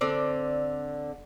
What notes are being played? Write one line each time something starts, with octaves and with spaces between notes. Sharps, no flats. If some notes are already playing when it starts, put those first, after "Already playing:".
D3 C4 D5